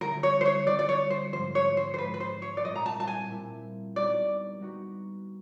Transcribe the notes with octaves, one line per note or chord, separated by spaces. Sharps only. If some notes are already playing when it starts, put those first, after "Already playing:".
D3 G3 C4 E4 A#4
C#5
C5
C#5
D3 G3 C4 E4 D5
D5
C#5
C5
G#2 F3 G#3 C5
C#5
C5
C5
G#2 F3 G#3 B4
B4
C5
C#5
D5
A#2 G3 C4 E4 D#5
A#5
A5
A5
G#5
A#2 G3 C4 E4
G3 B3 D#4 F#4 D5
G3 B3 D#4 F#4